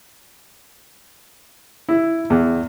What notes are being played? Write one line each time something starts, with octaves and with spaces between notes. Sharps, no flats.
E4
E2